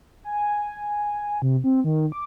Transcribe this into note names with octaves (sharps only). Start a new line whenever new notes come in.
G#5
C3
C4
D#3
D6